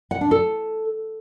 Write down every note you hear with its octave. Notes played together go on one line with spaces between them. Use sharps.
F#5
D4
A4